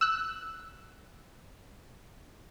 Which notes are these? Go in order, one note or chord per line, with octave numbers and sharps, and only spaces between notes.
E6 F#6